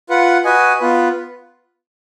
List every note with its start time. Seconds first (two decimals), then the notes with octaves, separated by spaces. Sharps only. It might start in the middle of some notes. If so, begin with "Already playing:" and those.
0.09 F4 B4 F#5
0.44 F#4 B4 D#5 G#5
0.80 B3 F4 B4